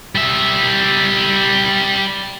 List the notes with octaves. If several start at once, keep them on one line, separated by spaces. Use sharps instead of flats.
G3 E5